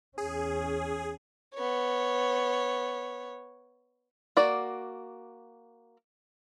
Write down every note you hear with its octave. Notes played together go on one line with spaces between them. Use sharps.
E2 C#4 G#4
B3 C#5
A#3 F#4 D5